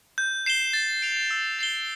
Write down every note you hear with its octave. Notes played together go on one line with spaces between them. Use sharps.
G6
C7 E7 G7
A6
D7 F7
E6
A6 C7 G7